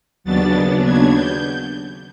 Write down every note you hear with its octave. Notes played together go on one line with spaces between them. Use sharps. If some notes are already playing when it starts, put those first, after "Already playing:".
D#2 C#3 F#3 B3 D4 A6
G#6
G6